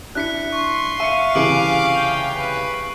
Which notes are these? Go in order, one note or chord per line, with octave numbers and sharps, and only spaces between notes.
D4 E4 F#6 B6 C#7
C6 C#6
E5 F5 C#7 D#7
C2 C#3 E3 D6 C7 D7 F#7
G5
B4